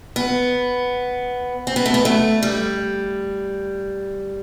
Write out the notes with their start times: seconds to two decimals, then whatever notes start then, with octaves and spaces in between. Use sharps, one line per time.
0.16 B3
1.67 C4
1.76 B3
1.86 A3
1.94 B3
2.05 A3
2.43 G3